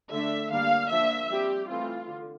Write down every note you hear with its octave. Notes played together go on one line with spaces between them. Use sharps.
D3 A3 D4 E5
D3 G3 A#3 D4 F5
F3 A#3 D4 E5
G3 C4 G4
E3 A3 C4 F4
D3